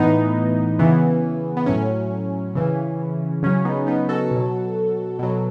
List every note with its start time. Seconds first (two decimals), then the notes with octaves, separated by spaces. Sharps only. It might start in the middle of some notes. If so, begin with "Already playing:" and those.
Already playing: A2 E3 B3 D#4
0.79 C#3 E3 B3
1.57 B3
1.66 A2 F#3 C#4
2.55 C#3 E3
3.43 C#3 F#3 C#4
3.65 B3 D#4
3.87 B3 D#4
4.09 F#4 A4
4.31 B2 F#3
5.19 B2 F#3